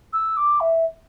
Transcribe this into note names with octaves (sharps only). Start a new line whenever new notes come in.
E6
D6
E5